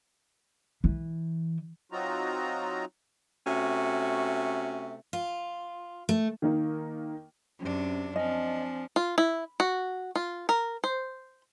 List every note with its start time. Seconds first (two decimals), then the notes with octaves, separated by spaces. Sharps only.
0.84 E3
1.92 F#3 C4 D#4 F4 F#4 A#5
3.47 C3 A3 C#4 F#4
5.13 F4
6.09 A3
6.42 D#3 A#3 D#4
7.60 F#2 C3 C#4 D4
8.16 F3 C4 D4 D#5 G#5
8.96 F4
9.18 E4
9.60 F#4
10.16 F4
10.49 A#4
10.84 C5